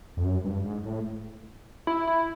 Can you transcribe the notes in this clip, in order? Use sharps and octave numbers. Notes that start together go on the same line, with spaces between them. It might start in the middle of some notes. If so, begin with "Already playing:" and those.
F2
F#2
G2
G#2
A2
E4
E4